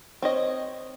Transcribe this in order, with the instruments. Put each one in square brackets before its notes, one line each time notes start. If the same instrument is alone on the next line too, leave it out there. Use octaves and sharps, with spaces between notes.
[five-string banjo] C4 C#5 D#5